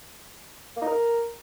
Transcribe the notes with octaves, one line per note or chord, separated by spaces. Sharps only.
A#3
D#4
A#4